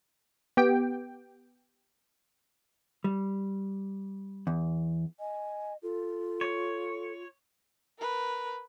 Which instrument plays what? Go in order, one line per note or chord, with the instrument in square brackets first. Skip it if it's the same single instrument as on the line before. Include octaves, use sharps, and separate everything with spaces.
[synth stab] B3 G4 G5
[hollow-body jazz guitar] G3
E2
[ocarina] D#5 [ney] G#5
[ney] F4 [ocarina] A4
[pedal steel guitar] C#5
[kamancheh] A#4 B4